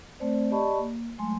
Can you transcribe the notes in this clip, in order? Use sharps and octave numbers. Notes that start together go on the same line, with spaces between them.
A3 C4 C5 D5
G4 D5 D#5 A5 B5 C#6
A#3
F#3 G#3 A3 G#5 C6